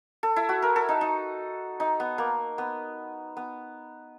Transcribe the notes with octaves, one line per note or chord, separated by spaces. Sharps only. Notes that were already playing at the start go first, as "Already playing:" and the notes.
A4
E4
F#4
A#4
A4
D#4
D#4
D#4
B3
A#3
B3
B3